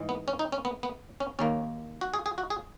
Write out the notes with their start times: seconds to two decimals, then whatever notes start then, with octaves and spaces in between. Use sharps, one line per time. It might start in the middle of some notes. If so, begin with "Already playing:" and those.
Already playing: G#2 E3 G#3
0.09 B3
0.28 C#4
0.39 D#4
0.52 C#4
0.65 B3
0.83 B3
1.20 C#4
1.39 D#2 D#3 A#3 C#4
2.01 F#4
2.14 G#4
2.26 G#4
2.38 F#4
2.50 G#4